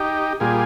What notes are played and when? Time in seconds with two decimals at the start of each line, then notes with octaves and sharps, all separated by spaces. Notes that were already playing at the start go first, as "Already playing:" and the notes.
Already playing: D#4 G4
0.40 A#2 G3 F4 G#4